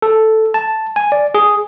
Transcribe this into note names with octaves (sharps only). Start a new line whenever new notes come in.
A4
A5
G#5
D5
G#4